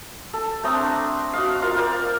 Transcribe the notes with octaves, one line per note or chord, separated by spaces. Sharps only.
A4
A3 C4 A#5 D#6
D4
F#4 D#5 F5
F4 A#4 F5 C6
A#4 C5 D5